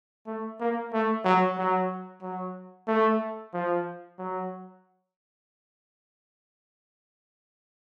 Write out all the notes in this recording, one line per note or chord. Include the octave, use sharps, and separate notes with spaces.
A3
A#3
A3
F#3
F#3
F#3
A3
F3
F#3